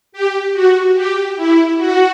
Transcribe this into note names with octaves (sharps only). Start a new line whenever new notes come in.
G4
F#4
G4
E4
F#4